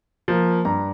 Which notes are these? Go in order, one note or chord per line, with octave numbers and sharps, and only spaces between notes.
F3 A#3
G2 A#5